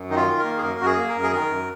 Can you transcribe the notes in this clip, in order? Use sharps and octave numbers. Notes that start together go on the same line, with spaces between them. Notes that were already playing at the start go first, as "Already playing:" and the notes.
Already playing: F#2
D#3 D#4
F4
D#3
A#4
A#3
G#4
F#2 A#4
F#2 F#4
G#4
A#3
A#4
F#2
G#4
D#3 A#4
F#2